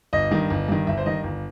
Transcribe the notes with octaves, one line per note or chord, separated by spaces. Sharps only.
G1 D#5
G2 D#3
G1
G2 D#3
G1 E5
C5
G2 D#3 D#5
G1